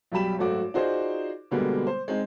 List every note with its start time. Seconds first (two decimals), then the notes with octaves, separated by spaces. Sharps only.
0.12 B1 F#2 G3 G4 B5 E7
0.38 G#1 F#2 A3 F#4 D6
0.74 D#4 F4 F#4 G#4 C5 D5
1.51 B2 D3 G3 G#3 A#3 B3
1.87 C5
2.08 G#3 C4 D#4